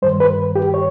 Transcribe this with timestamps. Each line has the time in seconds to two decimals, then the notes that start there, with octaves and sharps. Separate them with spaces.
0.02 G2 D#3 G3 C5
0.20 B4
0.56 G4
0.74 C#5